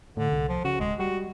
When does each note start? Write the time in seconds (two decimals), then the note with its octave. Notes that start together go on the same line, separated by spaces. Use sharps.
0.17 A2 D3
0.32 C2
0.49 F3
0.65 C#3 F#4
0.80 D1 G#3
0.99 G3 F#4